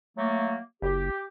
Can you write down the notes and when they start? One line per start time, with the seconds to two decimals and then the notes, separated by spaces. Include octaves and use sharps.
0.18 F#3 A3 A#3
0.82 F#1 G4